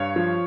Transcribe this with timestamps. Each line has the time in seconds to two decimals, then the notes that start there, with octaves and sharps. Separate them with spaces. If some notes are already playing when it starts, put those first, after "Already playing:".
Already playing: G2 C#5 F5
0.16 F3